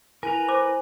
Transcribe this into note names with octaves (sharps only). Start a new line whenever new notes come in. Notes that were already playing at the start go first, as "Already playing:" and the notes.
E4 A#4 B4 G#5 A#5
C5 D6